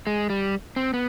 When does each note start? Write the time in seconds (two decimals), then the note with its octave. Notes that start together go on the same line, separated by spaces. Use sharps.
0.07 G#3
0.30 G3
0.76 C4
0.94 B3